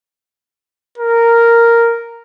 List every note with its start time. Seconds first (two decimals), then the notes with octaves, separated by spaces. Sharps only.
0.98 A#4